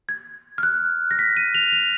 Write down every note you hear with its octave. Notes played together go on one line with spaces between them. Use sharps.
G#6
F6
F#6
A#6
B6
D#7
F7
F7